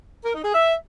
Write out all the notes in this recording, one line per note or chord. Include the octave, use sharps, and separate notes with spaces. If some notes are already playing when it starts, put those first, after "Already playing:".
A#4
D#4
G#4
E5